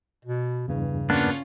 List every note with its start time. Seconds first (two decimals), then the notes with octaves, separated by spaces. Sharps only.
0.25 B2
0.68 E2 G2 C#3 E3
1.10 A#3 B3 C#4 D4 F4